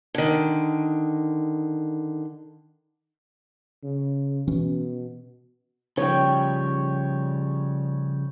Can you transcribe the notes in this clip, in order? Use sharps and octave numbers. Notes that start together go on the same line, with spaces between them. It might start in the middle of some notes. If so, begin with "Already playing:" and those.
D3 D#3
C#3
B2 E3 C#4
C#3 F3 G3 C#5 G5